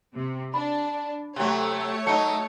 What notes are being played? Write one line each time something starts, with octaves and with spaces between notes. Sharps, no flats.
C3
D4 B5
C3 F#3 A3 C#5
F#3 D#4 A5 C#7